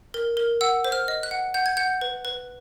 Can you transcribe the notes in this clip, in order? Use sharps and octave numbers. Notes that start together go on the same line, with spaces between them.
A#4
A#4
F#5 E6
C5
F6
D#5
F#6
F#5
F#5 G6
G#6
F#5 G6
B4
B4